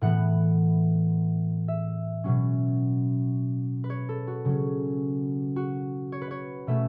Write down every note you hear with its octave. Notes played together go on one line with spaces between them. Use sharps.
A2 E3 B3 F#5
E5
B2 F#3 C#4
B4
C#5
A4
F#4
C#3 F#3 C#4
F#4
C#5
B4
C#5
B2 A3 C#4 E5